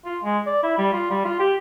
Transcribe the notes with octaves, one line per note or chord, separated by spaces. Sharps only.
F4
G#3
D5
E4
G3
F4
G3
F4
G4